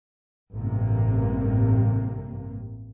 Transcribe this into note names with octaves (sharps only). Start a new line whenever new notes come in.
A1 G2 C3 A#3